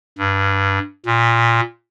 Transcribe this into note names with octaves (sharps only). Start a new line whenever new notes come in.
G2
A#2